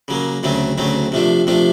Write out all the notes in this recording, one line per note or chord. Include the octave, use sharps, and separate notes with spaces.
C#3 F#3 A#3
D2 C#3 F#3 A3 C4
D2 C#3 F#3 A3 C4
C3 F3 A3 D4
C3 F3 A3 D4